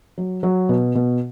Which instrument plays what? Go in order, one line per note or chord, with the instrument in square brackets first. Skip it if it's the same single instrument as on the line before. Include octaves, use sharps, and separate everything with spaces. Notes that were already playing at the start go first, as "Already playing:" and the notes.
[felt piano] F#3
F#3
B2
B2